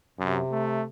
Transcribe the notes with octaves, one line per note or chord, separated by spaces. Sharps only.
F#2 C3
A3